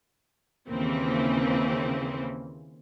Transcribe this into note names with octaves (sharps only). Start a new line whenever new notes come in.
D#2 C#3 E3 A#3 C4